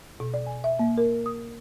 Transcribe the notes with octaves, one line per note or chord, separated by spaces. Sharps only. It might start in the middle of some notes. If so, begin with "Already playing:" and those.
B2
D5
G#5
E5
A#3
A#4
D#6